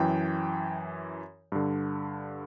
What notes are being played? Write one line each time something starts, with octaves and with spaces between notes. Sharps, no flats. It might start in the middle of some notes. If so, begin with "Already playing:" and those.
Already playing: F#2 E3 G5
G2 D3